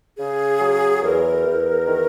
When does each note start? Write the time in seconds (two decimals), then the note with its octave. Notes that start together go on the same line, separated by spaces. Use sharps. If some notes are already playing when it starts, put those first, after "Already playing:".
0.18 C#3 G#4
0.61 F#3
1.03 E2 A#4
1.46 E2
1.87 D#3